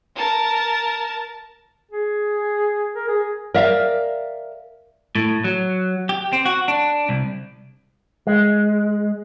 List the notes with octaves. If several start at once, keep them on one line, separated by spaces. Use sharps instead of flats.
A#4 A5
G#4
A#4
G#4
A#4 D5 E5 F5
A2
F#3
G4
C4
F#4
D4
C2
G#3